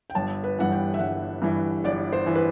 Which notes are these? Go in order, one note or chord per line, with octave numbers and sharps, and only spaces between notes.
G5
G1 A5
B4
G2 E3 F#5
G5
E5
G1 F#5
G2 E3
G1 D5
C5
E3
B4